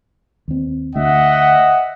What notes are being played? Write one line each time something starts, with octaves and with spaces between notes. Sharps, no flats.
D#2 C4
D2 D#5 E5 F#5